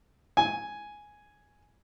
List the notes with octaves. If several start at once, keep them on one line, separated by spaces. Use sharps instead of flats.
G#5